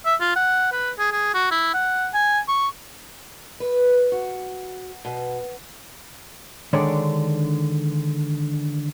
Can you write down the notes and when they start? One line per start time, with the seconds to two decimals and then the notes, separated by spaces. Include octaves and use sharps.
0.06 E5
0.21 F4
0.36 F#5
0.72 B4
0.99 G#4
1.12 G#4
1.34 F#4
1.51 E4
1.74 F#5
2.14 G#5
2.48 C#6
3.60 B4
4.12 F#4
5.05 B2
6.73 D3 D#3 G#3 D4 C#5 D5